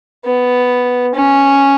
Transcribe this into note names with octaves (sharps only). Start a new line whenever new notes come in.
B3
C#4